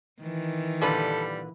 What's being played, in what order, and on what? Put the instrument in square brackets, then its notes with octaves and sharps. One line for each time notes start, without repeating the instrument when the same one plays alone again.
[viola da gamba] D#3 E3
[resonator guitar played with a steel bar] A#2 D3 B4 [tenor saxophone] G3 [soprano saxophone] A4